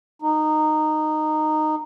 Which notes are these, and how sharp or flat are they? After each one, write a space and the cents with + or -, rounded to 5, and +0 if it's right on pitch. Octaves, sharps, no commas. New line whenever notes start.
D#4 -15